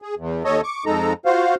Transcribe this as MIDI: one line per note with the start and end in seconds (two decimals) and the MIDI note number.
0.02 0.15 68
0.17 0.43 40
0.44 0.61 39
0.44 0.61 69
0.44 0.61 73
0.44 0.61 75
0.63 0.84 85
0.63 0.84 86
0.86 1.13 41
0.86 1.13 56
0.86 1.13 63
0.86 1.13 69
0.86 1.13 82
1.26 1.55 65
1.26 1.55 66
1.26 1.55 72
1.26 1.55 77